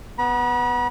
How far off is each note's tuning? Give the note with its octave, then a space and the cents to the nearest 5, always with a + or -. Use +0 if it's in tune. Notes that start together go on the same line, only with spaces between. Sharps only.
B3 +0 B5 -45